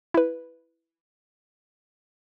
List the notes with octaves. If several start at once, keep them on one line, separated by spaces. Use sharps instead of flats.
E4 B4